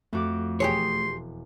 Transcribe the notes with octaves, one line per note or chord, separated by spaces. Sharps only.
F2 A3 F#4 D6
E1 G4 G#4 C#5 G#5 C6